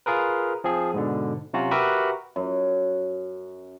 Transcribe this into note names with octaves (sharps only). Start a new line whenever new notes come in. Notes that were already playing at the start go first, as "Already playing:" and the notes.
F4 G#4 A#4 B4
F3 C4 G#4
G#2 B2 D3
C3 F#3 C#4 F4 F#4
F#4 G4 A#4 B4 E5
F#2